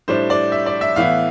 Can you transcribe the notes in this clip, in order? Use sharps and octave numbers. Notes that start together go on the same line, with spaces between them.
A2 G3 D4 C5
D5
E5
D5
E5
A2 E3 B3 E4 F5